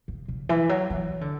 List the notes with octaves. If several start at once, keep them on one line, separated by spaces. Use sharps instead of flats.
C#3
C#3
E3
F#3
E3
D3